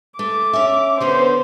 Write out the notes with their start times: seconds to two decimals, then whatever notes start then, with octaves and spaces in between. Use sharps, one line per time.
0.19 A3 D6
0.53 C#4 E5
1.01 D3 B3 C#4 C5